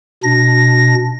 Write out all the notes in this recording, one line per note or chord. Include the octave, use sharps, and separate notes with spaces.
B2 D4 A#6